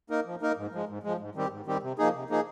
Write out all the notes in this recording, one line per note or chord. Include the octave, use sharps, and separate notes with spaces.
A#3 D#4 A#4
F3
A#3 D#4 A#4
G#2
F3 G#3
G#2
F3 G#3
G#2
D#3 G3 C4 G4
G#2
D#3 G3 C4 G4
C3
F3 A#3 D#4 G#4
C3
F3 A#3 D#4 G#4